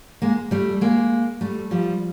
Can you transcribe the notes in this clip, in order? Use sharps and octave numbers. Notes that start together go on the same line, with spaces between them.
G#3 A#3
G3 A3
G#3 A#3
G3 A3
F3 G3